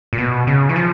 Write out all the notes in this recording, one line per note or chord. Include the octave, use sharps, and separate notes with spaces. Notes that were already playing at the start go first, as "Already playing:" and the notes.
A#2
B2
C#3
E3
F3